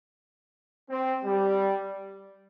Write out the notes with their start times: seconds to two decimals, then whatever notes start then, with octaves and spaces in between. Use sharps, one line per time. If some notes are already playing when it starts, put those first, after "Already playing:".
0.90 C4
1.25 G3